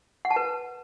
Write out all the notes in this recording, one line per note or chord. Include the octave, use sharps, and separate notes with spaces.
F#5
A5
B4